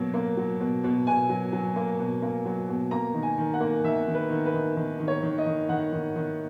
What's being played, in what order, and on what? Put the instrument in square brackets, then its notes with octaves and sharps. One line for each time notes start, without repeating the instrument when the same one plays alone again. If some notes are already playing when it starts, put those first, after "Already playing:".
Already playing: [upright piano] B2 F#3 A#3
A#3
F#3
B2
B2
B2 G#5
F#3
F#3
A#3
B2
A#3
F#3
B2
A#3 A#5
D#3
G#5
D#3
F#5
A#3
D#3 E5
D#3
B4
D#3
B4
D#3
D#3
D#3
C#5
D#3
D#5
D#3
D#3 F#5
D#3
D#3